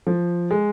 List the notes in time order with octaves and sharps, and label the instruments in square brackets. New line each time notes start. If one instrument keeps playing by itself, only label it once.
[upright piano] F3
G#3